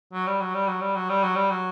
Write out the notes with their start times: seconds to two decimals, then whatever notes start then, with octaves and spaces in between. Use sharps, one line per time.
0.13 F#3
0.27 G3
0.40 F#3
0.54 G3
0.67 F#3
0.81 G3
0.95 F#3
1.09 G3
1.23 F#3
1.36 G3
1.50 F#3